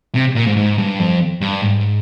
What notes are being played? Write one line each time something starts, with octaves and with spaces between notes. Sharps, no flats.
C3
A#2
G#2
G#2
G2
F2
G2
G#2